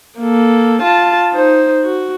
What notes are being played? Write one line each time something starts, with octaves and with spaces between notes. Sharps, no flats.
A#3 A4
F4 A5
D#4 C5
F#4